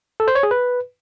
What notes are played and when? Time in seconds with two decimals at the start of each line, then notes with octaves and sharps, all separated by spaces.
0.20 A4
0.28 C5
0.35 C#5
0.43 G#4
0.51 B4